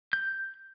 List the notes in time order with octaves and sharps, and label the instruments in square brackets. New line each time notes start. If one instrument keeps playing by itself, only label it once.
[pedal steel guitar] G6